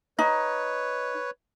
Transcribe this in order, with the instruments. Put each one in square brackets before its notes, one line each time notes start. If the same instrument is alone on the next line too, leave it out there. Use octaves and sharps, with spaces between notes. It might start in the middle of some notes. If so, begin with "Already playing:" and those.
[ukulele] D#4 [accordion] B4 C#5